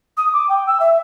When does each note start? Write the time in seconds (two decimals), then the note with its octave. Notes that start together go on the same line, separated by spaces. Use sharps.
0.17 D#6
0.33 D6
0.49 G5
0.67 E6
0.80 E5